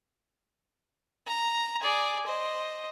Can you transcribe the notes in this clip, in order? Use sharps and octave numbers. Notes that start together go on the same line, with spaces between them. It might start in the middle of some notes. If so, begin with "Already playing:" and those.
A#5
G#4 D5
C5 D#5